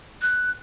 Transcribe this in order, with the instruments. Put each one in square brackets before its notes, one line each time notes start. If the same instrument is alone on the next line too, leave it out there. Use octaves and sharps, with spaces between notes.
[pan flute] F#6